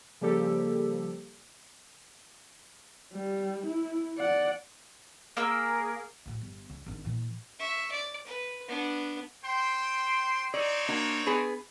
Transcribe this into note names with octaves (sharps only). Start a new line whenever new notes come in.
C#3 F3 G3 A#3 G4 A4
G3
E4
D5 F#5
A#3 G#4 A#4 E6
D2 A2
G1
C#2
G#1 D4
A#2 E3
E5 C#6
D5
B4
B3 D4
C5 G5 C6
C4 D#4 C#5 D5
A#3 D4 F#4
B3 G#4 B4